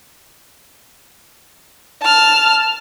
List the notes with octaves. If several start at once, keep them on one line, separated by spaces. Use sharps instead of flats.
A5 F6